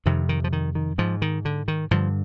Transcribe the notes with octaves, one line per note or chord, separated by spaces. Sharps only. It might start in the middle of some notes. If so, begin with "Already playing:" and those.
F2 C3 D#3
D#3
F3
D#3
D#3
G#2 F3
D#3
D3
D#3
G2 D3 F3